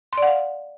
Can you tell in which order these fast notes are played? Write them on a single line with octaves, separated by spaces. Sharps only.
C6 D5 F#5 F5